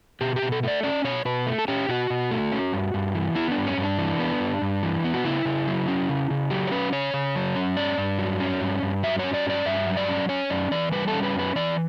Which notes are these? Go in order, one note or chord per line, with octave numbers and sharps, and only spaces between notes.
B2 G4
G4
B2
A4
A3 D5
C#4 D5
B2 C#5
B2 B4
A3
A4
C#4 G4
B2 F#4
B2
A3
C#4
G2
G2
E3
B3 E4
D4
G2
C#4
G2
D4
E3
B3
G2
G2
E3
B3
F#4
C#3 E4
C#3
F#3
C#4
C#3
C#3
F#3 G4
C#5
C#4 B4
C#3 C#5
C#3
F#3
C#4
G2 D5
G2
F#3
C#4
G2
G2
F#3 E5
C#4 C#5
D5
G2 D5
G2 E5
F#3
D5
C#4
C#4 C#5
F#2 D5
E3 D5
G3 B4
A4
C#4
B4
F#2 B4
E3 D5